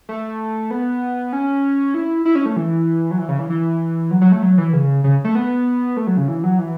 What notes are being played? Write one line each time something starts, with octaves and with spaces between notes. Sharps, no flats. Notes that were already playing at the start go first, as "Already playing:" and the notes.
A3
B3
C#4
E4
E4
C#4
A3
E3
F#3
E3
C#3
E3
E3
F#3
F#3
A3
F#3
E3
C#3
C#3
A3
B3
A3
F#3
C#3
E3
F#3
E3